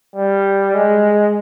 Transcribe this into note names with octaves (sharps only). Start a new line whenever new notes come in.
G3
G#3